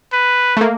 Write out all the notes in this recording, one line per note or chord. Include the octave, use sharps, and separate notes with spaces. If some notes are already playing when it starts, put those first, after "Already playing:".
B4
A3
A#3